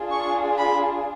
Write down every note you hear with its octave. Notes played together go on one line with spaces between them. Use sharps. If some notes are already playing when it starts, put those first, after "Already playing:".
Already playing: D4 F4 G#4
C#6
B5